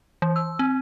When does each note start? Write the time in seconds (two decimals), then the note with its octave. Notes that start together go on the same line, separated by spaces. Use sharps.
0.22 E3
0.36 E6
0.59 C4